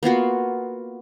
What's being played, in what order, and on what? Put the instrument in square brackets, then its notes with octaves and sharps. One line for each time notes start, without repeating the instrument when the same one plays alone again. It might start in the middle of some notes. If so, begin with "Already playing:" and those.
[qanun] A#3 B3 F4 F#4